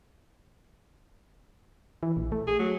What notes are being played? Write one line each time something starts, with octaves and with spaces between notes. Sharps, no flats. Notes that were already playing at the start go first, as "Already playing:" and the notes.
E3
A#1
A3
G#4
F#3